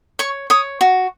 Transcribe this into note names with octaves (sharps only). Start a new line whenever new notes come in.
C#5 C#6
C#5 D#6
F#4